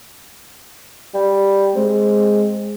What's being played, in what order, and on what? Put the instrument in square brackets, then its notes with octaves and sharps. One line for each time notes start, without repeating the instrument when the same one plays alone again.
[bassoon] G3
[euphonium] G#3 [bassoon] C4